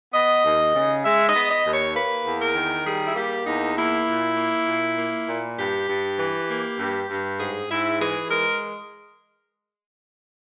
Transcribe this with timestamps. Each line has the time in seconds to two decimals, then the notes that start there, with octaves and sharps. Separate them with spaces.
0.13 B3 D#5
0.43 D#2
0.74 C#3
1.04 G#3 E5
1.28 D#5
1.34 B3
1.50 D#5
1.65 D#2
1.73 C#5
1.95 A#3 B4
2.25 E2
2.40 A#4
2.55 D#3
2.85 G3 G#4
3.06 E4
3.15 A#3 G4
3.46 E2 D#4
3.76 A#3 E4
4.07 A#2
4.36 A#3
4.67 A#2
4.97 A#3
5.28 A#2
5.58 G2 G4
5.88 G2
6.18 E3
6.48 A#3
6.78 G2
7.08 G2
7.39 G#2 G#4
7.70 G#2 E4
8.00 E3 G#4
8.29 G#3 A#4